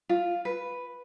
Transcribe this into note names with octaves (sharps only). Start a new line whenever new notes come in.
F4
B4